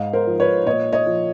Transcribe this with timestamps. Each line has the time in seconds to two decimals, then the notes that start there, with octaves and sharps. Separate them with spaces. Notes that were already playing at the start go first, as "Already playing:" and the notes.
Already playing: G#2 D#5 F5
0.13 A#4 C5
0.27 F3
0.40 B4 C#5
0.66 A#2 C#5 D#5
0.93 C#5 D#5
1.06 F3